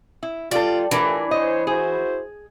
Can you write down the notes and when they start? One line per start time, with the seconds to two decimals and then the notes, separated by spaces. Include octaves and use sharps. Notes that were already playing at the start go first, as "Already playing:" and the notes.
0.23 E4
0.51 G3 F4 A4 D5
0.91 A2 E3 D4 F4 A4 A#4
1.31 C5 C#5 D#5
1.67 E4 F#4 G#4 C5